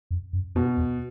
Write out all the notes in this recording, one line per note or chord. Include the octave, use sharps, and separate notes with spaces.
F2
F#2
F2 B2
E2